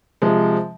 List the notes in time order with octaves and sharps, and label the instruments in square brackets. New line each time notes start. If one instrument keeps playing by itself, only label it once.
[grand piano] C3 F3 G#3